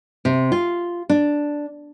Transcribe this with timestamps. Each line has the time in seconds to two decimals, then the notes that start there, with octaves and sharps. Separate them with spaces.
0.25 C3
0.52 F4
1.09 D4